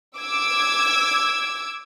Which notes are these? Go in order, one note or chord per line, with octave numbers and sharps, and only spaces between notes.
D6 E6 G#6